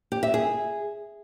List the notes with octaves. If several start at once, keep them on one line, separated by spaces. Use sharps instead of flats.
G4
E5
G#4